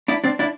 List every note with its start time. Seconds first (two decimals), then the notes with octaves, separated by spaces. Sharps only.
0.08 D4 E4
0.24 C4 D4
0.39 D4 E4